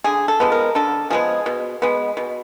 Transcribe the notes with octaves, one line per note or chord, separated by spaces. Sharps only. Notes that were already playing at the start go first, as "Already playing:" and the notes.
D3 G#4
A4
F3 G#3 B3
A#4
D3 A4
F3 G#3 B3 G#4
B2
G#3 B3
B2